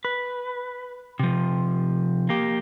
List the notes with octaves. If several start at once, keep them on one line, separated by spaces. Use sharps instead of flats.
B4
C3 F3
A#3 G4